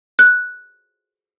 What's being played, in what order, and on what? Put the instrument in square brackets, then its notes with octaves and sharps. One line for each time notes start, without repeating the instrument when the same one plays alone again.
[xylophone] F#6